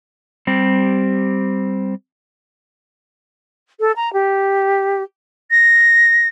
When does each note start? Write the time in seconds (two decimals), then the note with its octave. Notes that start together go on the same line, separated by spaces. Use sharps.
0.47 G3 C4 G4
3.80 A4
3.96 A#5
4.13 G4
5.51 A#6